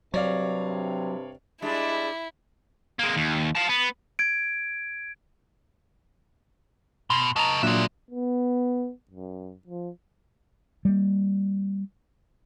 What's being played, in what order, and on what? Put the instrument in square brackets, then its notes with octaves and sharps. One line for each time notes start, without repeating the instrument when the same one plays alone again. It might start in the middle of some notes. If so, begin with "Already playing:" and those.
[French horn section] G2 C3 [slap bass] F#3 [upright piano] C#5 D5 F5
[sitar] G3 G#3 D4 [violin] E4
[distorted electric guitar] G#3 A#3
D#2
F5 A5
B3
[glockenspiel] G#6 D7
[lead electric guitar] B2 [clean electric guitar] C6
[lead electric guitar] F#3 D#5 [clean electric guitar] A5 A#5
[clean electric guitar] A#2 F#3 D4 [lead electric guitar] G#3 E5
[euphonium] B3
F#2
F3
[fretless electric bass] G3 A#3